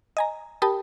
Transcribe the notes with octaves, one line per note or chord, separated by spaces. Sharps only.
D#5 G#5 A#5
G4 A#4 G5 A5 B5 D#6